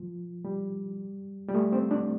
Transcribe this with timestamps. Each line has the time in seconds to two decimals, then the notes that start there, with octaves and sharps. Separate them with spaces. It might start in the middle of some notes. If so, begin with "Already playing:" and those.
Already playing: F3
0.45 G3
1.48 G3
1.54 A3
1.72 C4
1.91 D4